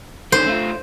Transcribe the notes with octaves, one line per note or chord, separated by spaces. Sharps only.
D#3 C#4 C5
A3 F4